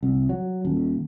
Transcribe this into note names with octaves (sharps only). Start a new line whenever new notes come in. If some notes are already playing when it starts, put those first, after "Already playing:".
C2
F#3
D#1